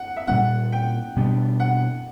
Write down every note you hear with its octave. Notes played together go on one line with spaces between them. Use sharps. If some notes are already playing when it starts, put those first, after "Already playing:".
Already playing: F#5
E5
A#2 G3 A#3 C#4 F#5
G5
B2 G3 B3 D4
F#5